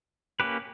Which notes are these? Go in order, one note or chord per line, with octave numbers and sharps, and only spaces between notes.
A#3 C#4 G4 B4